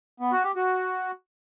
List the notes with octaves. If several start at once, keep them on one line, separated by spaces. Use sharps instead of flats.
B3
F#4
G4
F#4